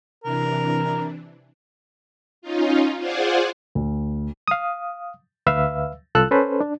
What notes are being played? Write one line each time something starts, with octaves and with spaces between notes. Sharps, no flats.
C3 E3 D4 A#4
C#4 D#4 F4
F4 G#4 C5 D5 F#5 G#5
D2
F5 D#6
D2 B4 E5 F5 E6
C2 F4 A4 E6 F#6
C#4 A4 B4 C5
D4